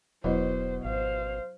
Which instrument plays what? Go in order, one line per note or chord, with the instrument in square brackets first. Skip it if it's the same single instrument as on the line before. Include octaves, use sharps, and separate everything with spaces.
[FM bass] E1 [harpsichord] B2 [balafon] F#3 E4 D#5 [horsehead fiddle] C5
[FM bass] G#1 [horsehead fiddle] C5 F5